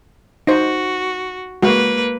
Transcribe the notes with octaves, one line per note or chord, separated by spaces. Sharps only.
D#4 F#4 C5
G#3 A#3 F#4 B4